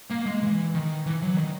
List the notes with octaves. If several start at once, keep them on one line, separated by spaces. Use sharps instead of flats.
A#3
G#3
E3
D#3
E3
F#3
D#3